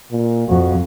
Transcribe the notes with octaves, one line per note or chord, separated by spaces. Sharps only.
A#2
F2 F#4